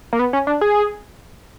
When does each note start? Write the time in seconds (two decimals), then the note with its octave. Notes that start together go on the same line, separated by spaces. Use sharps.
0.13 A#3
0.19 B3
0.33 C#4
0.47 D4
0.61 G#4